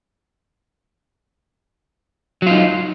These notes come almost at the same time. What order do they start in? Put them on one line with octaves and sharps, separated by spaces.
F#3 F4 D#4